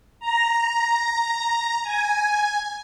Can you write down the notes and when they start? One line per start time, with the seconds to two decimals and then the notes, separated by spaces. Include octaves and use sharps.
0.20 A#5
1.83 G#5